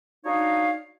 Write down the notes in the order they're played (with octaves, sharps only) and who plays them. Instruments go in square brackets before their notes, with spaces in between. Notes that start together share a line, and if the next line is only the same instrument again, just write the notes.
[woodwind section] D4 D#4 F#4 C#5 D#5 F5